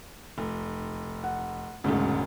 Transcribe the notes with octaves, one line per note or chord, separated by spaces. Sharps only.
F1
F#5
E1 D2 G#2 C#3